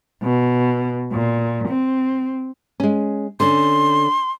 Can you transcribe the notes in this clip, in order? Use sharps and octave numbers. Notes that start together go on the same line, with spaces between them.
B2
A#2
C4
G#3 C#4
D3 C#4 C6